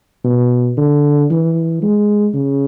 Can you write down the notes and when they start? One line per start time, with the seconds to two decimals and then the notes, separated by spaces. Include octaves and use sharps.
0.24 B2
0.78 D3
1.30 E3
1.82 G#3
2.34 C#3